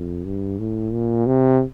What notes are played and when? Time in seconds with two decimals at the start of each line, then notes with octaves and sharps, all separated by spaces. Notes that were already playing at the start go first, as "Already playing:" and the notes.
Already playing: F2
0.25 G2
0.59 A2
0.93 A#2
1.27 C3